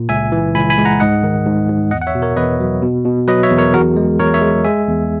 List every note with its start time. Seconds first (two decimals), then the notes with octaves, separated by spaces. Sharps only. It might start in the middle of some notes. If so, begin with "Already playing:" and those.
Already playing: A#2
0.09 C#2 E5 G#5
0.32 E3
0.55 C#2 G#5 B5
0.70 G#5 B5
0.78 G#3
0.85 F#5 A#5
1.00 G#2 D#5 F#5
1.23 D#3
1.46 G#2
1.69 G#2
1.91 E2 D#5 F#5
2.02 F#5
2.07 C#5 E5
2.15 B2
2.22 A#4 C#5
2.36 E2 B4 D#5
2.60 F#3
2.82 B2
3.05 B2
3.28 F#3 B4 D#5
3.43 C#5 E5
3.51 E2
3.58 A#4 C#5
3.74 E2 F#4 A#4
3.96 G#3
4.19 E2 A#4 C#5
4.34 C#5 E5
4.41 G#3
4.64 G#3 E5 G#5
4.87 E2